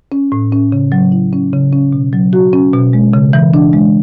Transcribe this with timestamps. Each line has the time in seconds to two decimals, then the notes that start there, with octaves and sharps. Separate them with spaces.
0.12 C#4
0.32 A2
0.52 C#4
0.72 C#3
0.92 F#3
1.12 E4
1.33 C#4
1.53 C#3
1.73 C#4
1.93 B2
2.13 F#3
2.33 F#4
2.53 C#4
2.73 B2
2.93 G#3
3.14 C#3
3.33 E3
3.54 D4
3.73 G#3